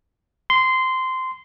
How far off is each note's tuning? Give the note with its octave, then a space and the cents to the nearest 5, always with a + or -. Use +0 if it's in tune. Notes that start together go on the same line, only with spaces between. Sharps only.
C6 -15